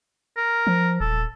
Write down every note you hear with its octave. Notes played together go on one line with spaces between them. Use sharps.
A#4
F3
D#1 A4